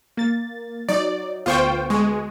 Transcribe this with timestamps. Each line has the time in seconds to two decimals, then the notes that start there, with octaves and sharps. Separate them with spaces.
0.17 A#3 A6
0.89 F#3 D#4 D5
1.46 D2 B3 F4 C5 G5 C#6
1.90 G#3